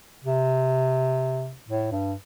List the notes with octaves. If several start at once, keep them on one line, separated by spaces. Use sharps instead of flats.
C3
A2
G2